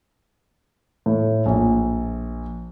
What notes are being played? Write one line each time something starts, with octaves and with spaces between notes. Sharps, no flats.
A2
A#1